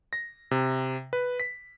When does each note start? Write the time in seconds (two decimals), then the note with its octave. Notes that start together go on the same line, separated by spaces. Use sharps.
0.13 A#6
0.51 C3
1.13 B4
1.40 B6